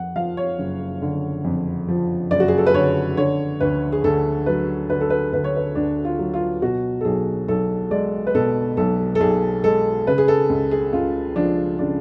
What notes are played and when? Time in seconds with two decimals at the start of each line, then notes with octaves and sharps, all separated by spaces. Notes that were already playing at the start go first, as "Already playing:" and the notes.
Already playing: F2 F#5
0.16 F3 F5
0.37 C#5
0.59 F#1
1.02 D3
1.45 F2
1.88 F3
2.31 F#1 D5
2.40 F#4
2.48 G#4
2.58 A4
2.66 B4
2.74 D3 C#5
3.17 D3 C#5
3.60 D2 B4
3.92 G#4
4.04 D2 A4
4.46 F#3 B4
4.90 D3 B4
5.01 A4
5.10 B4
5.33 D2 B4
5.44 C#5
5.56 B4
5.75 D2 D4
6.05 F4
6.19 F#3
6.34 F4
6.62 B2 F#4
7.01 A4
7.05 B1 G#4
7.48 B1 A4
7.91 G#3 D5
8.27 B4
8.35 B2 A4
8.77 B1 A4
9.15 A4
9.20 B1 G#4
9.64 G#3 A4
10.07 C#3 B4
10.18 G#4
10.28 A4
10.50 C#2
10.71 G#4
10.93 C#2 F4
11.36 F3 D4
11.79 C#3 D4